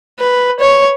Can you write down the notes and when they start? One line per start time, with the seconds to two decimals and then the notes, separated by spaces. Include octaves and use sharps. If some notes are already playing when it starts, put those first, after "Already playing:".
0.19 B4
0.60 C#5